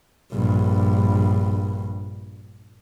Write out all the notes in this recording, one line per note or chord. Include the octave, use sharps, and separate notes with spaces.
A#1 G2